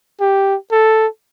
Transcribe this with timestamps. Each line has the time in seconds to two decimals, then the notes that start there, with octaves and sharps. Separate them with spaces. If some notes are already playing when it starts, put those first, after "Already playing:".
0.21 G4
0.72 A4